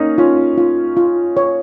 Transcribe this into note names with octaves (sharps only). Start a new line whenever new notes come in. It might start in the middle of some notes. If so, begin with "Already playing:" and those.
Already playing: A#3 C#4 D#4
C#4 F4
F4
F4
C#5